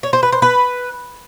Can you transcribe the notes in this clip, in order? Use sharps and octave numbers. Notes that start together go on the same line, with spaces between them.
C#5
C5
B4
C5
B4